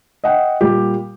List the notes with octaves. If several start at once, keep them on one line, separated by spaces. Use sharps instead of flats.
D#5 F#5 G5
A#2 G3 G4